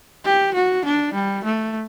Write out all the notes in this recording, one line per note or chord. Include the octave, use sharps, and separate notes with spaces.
G4
F#4
D4
G3
A3